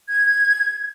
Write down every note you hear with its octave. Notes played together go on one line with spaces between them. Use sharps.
G#6